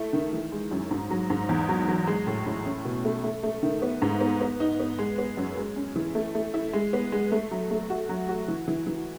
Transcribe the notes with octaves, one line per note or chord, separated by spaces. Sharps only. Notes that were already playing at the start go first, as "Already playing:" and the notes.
Already playing: A3 E4
D#3
E3
G#3
F#2
G#2
F#3
G#2
E2
F#3
F#3
G#3
A2
A2
C#4
B2
A3
A3
A3
D#3
B3
G#2
B3
B3
D#4
B3
G#3
B3
F#2
G#3
C#4
E3
A3
A3
E4
G#3
B3
G#3
A3
F#3
A3
F#4
F#3
F#4
E3
E3
E3